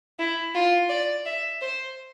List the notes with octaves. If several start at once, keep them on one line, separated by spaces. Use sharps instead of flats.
E4
F4
D5
E5
C5